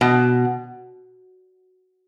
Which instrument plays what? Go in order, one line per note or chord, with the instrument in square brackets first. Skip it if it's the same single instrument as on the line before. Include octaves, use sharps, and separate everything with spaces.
[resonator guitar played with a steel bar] B2